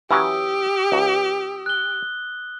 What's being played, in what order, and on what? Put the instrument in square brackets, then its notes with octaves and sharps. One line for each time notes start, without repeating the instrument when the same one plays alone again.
[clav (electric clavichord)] E3 F#3 C#4 [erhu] G4 [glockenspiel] D#6 E6
[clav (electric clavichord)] C#2
[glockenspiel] F#6 G7